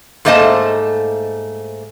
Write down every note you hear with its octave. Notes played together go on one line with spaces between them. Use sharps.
G#2 A3 A#3 C5 D#5 A5